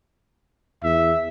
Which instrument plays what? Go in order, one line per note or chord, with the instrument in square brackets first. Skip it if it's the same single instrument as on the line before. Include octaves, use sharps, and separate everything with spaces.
[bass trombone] E2 [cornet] E5